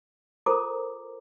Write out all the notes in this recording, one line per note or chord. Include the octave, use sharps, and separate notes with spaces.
F4 A4 A#4 C5 A#5 D6